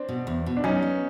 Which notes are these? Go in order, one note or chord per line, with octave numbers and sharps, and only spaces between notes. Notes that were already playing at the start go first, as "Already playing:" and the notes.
Already playing: C4 D4
B2
E2
B2
D4
F#3 C#4 D#4
B3